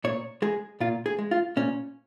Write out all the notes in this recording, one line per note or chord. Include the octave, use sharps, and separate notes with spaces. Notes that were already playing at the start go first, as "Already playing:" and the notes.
A#2 C#5
G#3 G#4
A#2 F4
G#4
G#3
F4
A#2 C#4